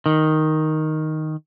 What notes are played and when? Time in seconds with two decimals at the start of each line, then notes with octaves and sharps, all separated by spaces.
0.06 D#3